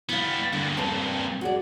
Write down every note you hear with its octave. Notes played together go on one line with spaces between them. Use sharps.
G3 B3 E4 F5
G2 A#2 D3
C4 B4 A5
F#4 G#4 D5